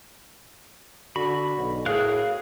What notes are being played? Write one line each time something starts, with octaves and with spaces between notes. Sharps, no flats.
D3 F#4 B5
B1
A2 G#4 A#4 F5 F#6